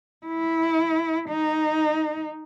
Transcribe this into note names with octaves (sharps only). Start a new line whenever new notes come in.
E4
D#4